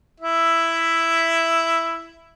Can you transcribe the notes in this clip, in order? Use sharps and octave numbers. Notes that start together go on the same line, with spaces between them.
E4 E5